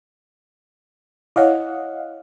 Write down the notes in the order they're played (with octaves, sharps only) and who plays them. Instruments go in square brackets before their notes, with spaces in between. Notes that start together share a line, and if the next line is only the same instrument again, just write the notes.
[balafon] E4 C#5 [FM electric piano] D#5 F5 F#5